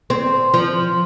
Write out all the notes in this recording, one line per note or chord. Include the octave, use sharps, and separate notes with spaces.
C4
F3